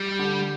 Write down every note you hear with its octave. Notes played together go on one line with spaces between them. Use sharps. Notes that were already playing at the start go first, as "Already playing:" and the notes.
Already playing: G3
D3